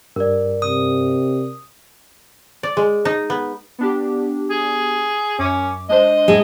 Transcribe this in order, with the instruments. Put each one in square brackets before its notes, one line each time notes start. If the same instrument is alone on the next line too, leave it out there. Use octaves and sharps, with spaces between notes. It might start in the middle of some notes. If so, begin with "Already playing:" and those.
[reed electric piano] G2 [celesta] A#4 D5
[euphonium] C3 [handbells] D#6
[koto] D5
G#3
D#4
B3
[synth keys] B3 D4 G4
[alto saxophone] G#4
[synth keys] F#2 D6 [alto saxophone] C#4
[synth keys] G#3 D4 C5 [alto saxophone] D#5
[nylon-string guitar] A2 G#3